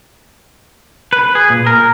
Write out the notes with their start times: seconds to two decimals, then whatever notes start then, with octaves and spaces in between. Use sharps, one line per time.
1.13 B4
1.35 G#4
1.50 A#2
1.66 A#4